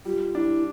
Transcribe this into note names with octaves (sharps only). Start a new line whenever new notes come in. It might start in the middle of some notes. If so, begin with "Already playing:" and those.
G3 F4
D4 E4